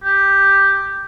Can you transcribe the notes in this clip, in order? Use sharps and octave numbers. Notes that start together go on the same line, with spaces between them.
G4